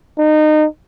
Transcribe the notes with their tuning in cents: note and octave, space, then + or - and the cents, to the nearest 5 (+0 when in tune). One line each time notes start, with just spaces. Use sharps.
D#4 -25